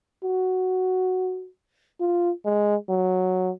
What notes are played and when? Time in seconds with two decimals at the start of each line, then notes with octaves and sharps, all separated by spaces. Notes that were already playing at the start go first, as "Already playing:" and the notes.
0.24 F#4
2.00 F4
2.45 G#3
2.89 F#3